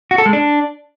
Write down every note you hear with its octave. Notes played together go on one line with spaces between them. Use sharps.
F#4
A4
G#3
D4